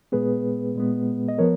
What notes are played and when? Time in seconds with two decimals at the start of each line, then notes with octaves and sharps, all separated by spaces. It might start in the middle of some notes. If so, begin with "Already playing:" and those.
0.12 A#2 G#3 B3 G#4 B4
0.75 A#2 G#3 B3
1.28 D#5
1.38 F3 B3 A#4 C#5